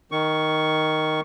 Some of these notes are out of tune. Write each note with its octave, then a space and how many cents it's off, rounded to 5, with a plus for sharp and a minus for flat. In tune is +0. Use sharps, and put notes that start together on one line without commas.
D#3 +0 C#6 +0